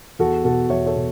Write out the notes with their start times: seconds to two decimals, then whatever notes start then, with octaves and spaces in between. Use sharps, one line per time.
0.19 E2 F#4 A4
0.44 B2 F#4 A4
0.70 E2 C#5 E5
0.86 A4 C#5
0.96 B2